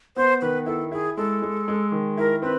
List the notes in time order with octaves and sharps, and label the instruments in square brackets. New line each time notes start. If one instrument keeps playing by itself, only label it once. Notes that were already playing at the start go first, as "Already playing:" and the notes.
[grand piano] B3 [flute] C5
[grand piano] D#3 [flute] B4
[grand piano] E4 [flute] A4
[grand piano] E4 [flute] G#4
[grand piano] G#3 [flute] A4
[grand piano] G#3
G#3
D#3
[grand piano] E4 [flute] A#4
[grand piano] C4 [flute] B4